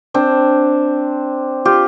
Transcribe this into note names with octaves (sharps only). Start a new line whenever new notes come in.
C4 D4
F4 G4